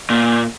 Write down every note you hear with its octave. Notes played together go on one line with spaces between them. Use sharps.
A#2